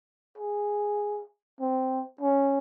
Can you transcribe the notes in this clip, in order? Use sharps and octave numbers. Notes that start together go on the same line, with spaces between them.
G#4
C4
C#4